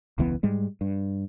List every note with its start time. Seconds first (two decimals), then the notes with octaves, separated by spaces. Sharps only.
0.18 E1 C#2 E3 B3
0.43 G#2 G3 G#3
0.81 G2